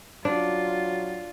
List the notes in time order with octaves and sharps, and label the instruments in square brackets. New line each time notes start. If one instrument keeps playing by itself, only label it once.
[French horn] F#3 [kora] D4 [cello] F4